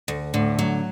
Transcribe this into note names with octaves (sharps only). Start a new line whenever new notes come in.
D2
A2 D3
F#3